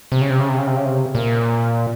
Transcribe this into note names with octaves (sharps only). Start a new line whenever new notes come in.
C3
C#3
C3
C#3
C3
C#3
C3
C#3
C3
A#2